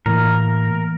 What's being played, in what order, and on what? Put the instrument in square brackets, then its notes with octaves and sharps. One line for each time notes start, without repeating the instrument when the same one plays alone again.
[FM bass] A2 [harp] E3 A#3 [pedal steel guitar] A#4